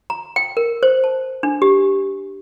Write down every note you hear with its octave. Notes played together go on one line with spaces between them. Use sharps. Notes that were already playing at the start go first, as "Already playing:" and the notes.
A#5
G5
A#4
C5
A5
D4
G4